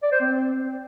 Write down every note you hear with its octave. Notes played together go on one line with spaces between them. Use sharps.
D5
C5
C4